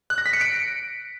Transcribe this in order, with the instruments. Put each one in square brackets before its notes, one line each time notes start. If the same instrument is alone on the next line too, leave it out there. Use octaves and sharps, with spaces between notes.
[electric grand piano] F#6
A#6
B6
C#7
D7